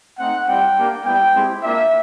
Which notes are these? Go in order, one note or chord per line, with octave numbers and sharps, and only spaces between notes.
A3 C4 D#4 F#5
G3 C4 E4 G4 G5
A#3 D4 G4
G3 B3 E4 G5
G#3 C4 E4 G4
A#3 D4 F4 E5